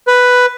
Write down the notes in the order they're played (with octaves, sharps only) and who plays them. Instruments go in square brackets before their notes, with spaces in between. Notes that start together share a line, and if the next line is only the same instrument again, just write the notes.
[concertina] B4